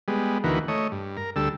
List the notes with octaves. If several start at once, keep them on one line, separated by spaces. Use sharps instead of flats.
G3 G#3 B3
D2 D#3 E3 A#3 F#4 B4
A3 C#5 D#5
G2
A#4
D2 G3 A4 E6